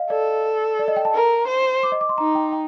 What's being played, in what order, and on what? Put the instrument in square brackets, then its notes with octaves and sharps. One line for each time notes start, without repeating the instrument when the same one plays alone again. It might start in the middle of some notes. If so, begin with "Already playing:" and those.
Already playing: [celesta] D#5 F5
[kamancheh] A4 [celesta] D5
[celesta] D5
D#5
G5
A5
[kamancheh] A#4
C5
[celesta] D6
D#5
D6
C6
[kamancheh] D#4 [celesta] A#5
[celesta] G5
G5